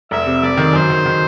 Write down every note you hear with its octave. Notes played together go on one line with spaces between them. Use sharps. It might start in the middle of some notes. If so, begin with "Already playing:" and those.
F1 E5
C3
F1 D5
D#3
F#2 C5
D#3
D#3